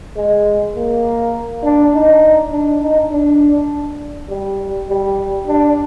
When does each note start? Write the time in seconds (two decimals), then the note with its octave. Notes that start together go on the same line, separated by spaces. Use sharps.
0.16 G#3
0.76 A#3
1.63 D4
1.94 D#4
2.52 D4
2.82 D#4
3.12 D4
4.29 G3
4.89 G3
5.47 D4